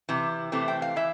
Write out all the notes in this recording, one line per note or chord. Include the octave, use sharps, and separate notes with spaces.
C3 E3
C3 E3 A3 C4
G5
F5
E3 E5